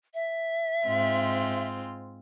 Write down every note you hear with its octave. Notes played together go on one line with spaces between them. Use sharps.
E5
G#2 C4 F4